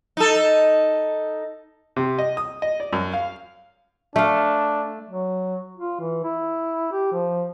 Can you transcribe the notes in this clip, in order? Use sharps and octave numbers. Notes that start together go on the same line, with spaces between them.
D#4 A4
C3
D#5
D#6
D#5
D5
F#2
F5
A3 D4 F5
F#3
F4
E3
E4
G4
F3